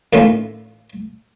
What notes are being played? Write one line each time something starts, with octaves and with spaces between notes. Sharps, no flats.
A2 D#3 A3 C#4 E4 F4